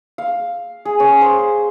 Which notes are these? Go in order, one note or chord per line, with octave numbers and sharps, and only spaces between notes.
F5
G#4
C#4
C5